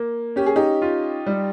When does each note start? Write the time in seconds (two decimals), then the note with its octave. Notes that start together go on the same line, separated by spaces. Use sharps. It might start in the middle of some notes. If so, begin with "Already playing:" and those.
Already playing: A#3
0.36 C#4 G4
0.46 G#4
0.56 D#4 G4
0.82 F4
1.26 G3